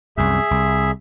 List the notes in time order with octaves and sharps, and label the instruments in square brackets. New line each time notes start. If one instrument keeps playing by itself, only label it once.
[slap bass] C2 F#2 [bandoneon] G#4 E5
[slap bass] C2